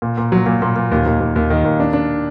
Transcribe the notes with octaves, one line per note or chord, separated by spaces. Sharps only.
A#2
A#2
F#3
A#2
A#2
A#2
D#2
D#2
D#2
D#2
D#3
D#2
D4
D4